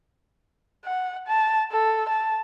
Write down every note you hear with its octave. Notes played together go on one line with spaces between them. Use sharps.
F#5
A5
A4
A5